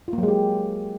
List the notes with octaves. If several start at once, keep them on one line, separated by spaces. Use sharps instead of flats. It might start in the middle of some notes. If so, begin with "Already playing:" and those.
F4
A#3
F#3
G#3
G4